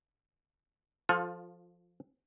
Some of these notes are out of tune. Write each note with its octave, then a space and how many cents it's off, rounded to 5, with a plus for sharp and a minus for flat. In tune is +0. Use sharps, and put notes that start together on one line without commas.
F3 +0 F4 +25 A4 +5